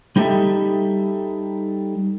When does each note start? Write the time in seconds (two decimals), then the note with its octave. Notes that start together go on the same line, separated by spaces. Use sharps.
0.16 G3 D#4 G4 A4 E5